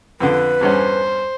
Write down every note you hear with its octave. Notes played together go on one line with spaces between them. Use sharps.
F2 D3 B4
E2 G2 C#4 C5